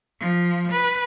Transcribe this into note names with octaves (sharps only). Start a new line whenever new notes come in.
F3
B4